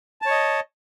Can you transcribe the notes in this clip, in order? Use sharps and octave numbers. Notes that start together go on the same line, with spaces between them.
C#5 D#5 A5